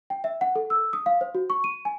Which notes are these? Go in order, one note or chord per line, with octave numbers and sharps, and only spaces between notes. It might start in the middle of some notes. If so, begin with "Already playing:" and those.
G5
E5
F#5
A4
E6
D#6
F5
C5
F#4
C#6
D#7
G#5